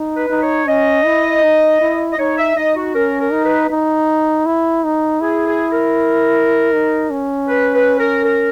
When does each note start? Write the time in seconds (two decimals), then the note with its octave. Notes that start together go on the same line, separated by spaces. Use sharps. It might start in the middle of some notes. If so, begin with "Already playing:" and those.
Already playing: D#4
0.17 B4
0.30 D#4
0.42 C#5
0.68 C#4 D#5
1.05 E4
1.43 D#4
1.81 E4
2.13 D#5
2.18 D#4 C#5
2.38 E5
2.57 D#4 D#5
2.76 F#4
2.95 C#4 A#4
3.20 A#4
3.32 D#4
3.45 B4
3.70 D#4
4.46 E4
4.84 D#4
5.21 E4 G#4
5.47 G#4
5.72 A#4
6.73 D#4
7.11 C#4
7.48 B4
7.74 B4
7.99 A#4
8.24 A#4